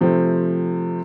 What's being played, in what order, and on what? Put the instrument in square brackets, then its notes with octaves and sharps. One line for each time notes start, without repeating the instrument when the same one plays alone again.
[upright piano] C3 F3 A3 C4